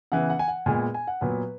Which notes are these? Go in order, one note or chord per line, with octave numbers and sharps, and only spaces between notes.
C#3 E3 B3 F#5
F#5
G#5
F#5
A#2 G#3 B3 G#5
G#5
F#5
A#2 F#3 B3 B4